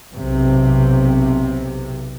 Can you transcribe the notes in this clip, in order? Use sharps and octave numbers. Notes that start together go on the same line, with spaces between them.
B1 C3